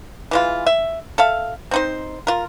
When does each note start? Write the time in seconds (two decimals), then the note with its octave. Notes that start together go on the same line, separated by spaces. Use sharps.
0.31 E3 G#3 F4
0.66 E5
1.18 A4 E5 F5
1.71 C4 D#4 C5
2.27 F4 A#4